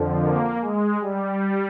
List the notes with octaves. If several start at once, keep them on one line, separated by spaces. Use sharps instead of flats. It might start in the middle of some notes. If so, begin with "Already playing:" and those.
Already playing: F2 D3 F3
A#3
G#3
G3